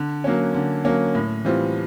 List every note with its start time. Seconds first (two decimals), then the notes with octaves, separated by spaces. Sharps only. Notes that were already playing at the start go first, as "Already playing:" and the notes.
Already playing: D3
0.24 F#3 A#3 C#4
0.54 D3
0.85 F#3 A#3 C#4
1.15 A2
1.45 E3 G3 C4 F4